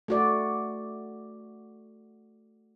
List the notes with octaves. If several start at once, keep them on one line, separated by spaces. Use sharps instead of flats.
A3 F#4 D5